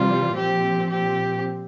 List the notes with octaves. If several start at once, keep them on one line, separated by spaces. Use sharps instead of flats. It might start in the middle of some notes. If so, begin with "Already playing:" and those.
Already playing: C3 E3 G3 F4
A#2 F3 C4 G4
G4